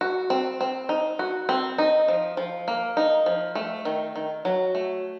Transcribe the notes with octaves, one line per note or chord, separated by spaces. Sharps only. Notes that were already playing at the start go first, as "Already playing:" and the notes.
F#4
C4
C4
D#4
F#4
C4
D#4
F3
F3
A#3
D#4
F3
A3
D#3
D#3
F#3
A3